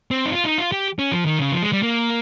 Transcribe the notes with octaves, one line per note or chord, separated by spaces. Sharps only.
C4
D#4
F4
D#4
F4
G4
C#4
F3
D#3
C#3
F3
G#3
G3
A#3